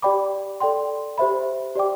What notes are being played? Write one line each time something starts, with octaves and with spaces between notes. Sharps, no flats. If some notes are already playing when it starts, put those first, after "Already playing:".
G4 D5 G5 B5 D6
A4 D5 G5 C6
G4 C5 E5 B5
G4 D5 G5 D6